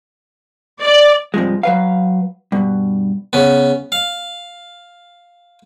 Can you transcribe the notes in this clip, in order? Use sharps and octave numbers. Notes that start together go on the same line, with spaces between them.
D5
G2 C3 F3 G#3
F#3 B4 F5
G2 B2
C#3 B3
F5